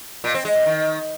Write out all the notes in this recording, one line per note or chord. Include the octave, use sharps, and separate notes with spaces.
A#2
C4
G#3
C3
D#3